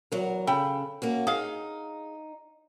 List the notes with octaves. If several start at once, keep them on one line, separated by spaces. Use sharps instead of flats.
E2 F#3 A#4
C#3 A4 G5 B5
A#3 C#4 F#4
D#4 G#4 F5